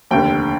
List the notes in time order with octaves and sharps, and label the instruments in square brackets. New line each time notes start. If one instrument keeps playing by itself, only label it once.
[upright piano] F1 D#2 D3 G5